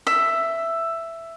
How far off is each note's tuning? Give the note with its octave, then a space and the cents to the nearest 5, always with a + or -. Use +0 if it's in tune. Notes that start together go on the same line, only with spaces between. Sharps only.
E5 +10